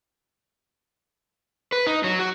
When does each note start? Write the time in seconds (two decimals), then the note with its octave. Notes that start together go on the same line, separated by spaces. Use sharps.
1.72 B4
1.87 D#4
2.04 F#3
2.19 F#4